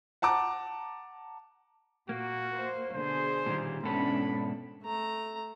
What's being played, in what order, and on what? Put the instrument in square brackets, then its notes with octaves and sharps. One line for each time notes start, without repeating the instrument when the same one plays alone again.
[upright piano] F#5 A5 A#5 D6
[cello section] A#2 [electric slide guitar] A#3 [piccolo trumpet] F#4
[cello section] C5
[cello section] B2 D3 G#4 [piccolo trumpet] C5
[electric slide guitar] A#2 D#3 G3
[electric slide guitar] G#2 B2 A4 [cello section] E3 C#4 D4 [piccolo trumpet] B5
[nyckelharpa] A3 A#5